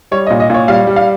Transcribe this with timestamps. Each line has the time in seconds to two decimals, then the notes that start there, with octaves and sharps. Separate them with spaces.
0.11 G3 C#5
0.27 D#5
0.30 A#2
0.40 D#5
0.50 A#2 C#5
0.68 G3 F5
0.87 G3
0.96 F5